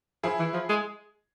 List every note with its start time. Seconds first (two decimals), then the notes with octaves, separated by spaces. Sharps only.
0.23 F3 E4 G#4
0.39 E3
0.54 F3
0.69 G#3